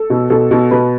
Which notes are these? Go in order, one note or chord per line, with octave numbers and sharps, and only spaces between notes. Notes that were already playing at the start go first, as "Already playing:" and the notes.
Already playing: A4
B2
B2 A4
B2
B2 B4